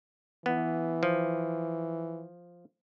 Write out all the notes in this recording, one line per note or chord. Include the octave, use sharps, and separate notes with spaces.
E3 B3
F3